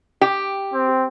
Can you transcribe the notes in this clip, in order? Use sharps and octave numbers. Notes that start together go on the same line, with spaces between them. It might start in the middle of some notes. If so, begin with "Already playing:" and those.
G4
C4